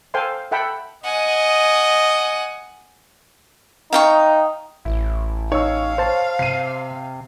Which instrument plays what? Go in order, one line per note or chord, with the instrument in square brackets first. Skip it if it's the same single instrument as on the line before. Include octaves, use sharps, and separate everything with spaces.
[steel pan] A4 C5 F5 G5 G#5 C6
A4 E5 F#5 G5 A5 B5
[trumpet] D#5 [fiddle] F#5 G#5
[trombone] D#4 [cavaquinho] F5 G5 C#6
[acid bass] A1 [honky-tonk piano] E4
[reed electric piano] D#4 [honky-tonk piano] C#5 E6 [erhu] F5
[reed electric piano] C5 A5
[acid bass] C3 [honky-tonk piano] C7 D#7